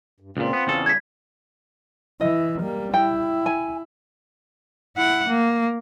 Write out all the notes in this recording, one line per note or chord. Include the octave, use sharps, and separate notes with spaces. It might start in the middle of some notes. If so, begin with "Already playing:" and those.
G2
C#2 A#2 C4 F4
B3
E2 C#3 A4
D2 G3 G#6 B6
E3 E4 D#5
G3 A#3
E4 G5
G#5
E4 F#5
A#3